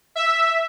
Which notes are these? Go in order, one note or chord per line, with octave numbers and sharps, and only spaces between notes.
E5